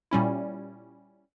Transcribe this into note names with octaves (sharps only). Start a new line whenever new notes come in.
A#2 G3 C#4 E4